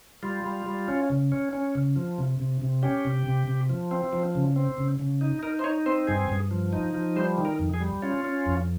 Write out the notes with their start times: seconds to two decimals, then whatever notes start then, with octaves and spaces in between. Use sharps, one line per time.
0.23 G3 F4
0.44 G3
0.66 G3
0.88 C#4
1.10 C#3
1.32 C#4
1.53 C#4
1.75 C#3
1.96 F3
2.18 C3
2.40 C3
2.62 C3
2.83 C#4 G4
3.05 C3
3.27 C3
3.47 C3
3.69 F3
3.91 C4
4.13 F3
4.35 C#3
4.56 C4
4.78 C#3
4.99 C#3
5.21 D#4
5.43 D#4 A#4
5.59 C5
5.64 D#4 C#5
5.86 C4 C5
6.07 G2 G#4
6.29 G2
6.51 F3
6.73 D#4
6.95 F3
7.16 G3 C5
7.38 D#3
7.45 A#4
7.59 F2
7.74 G#4
7.81 G3
8.02 C#4 F4
8.25 C#4
8.46 F2